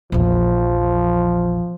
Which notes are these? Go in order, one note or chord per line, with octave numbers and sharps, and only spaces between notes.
A#1 E2 F3